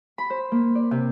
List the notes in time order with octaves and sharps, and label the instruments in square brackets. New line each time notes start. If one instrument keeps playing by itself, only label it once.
[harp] B5
C5
A#3
D5
C3